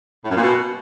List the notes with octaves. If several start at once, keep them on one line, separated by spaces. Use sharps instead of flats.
A2
F#2
A#2
B2